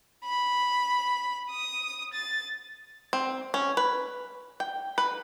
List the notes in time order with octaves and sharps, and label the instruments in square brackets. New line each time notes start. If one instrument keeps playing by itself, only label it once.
[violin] B5
D#6
A6
[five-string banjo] C4
C#4
B4
G5
B4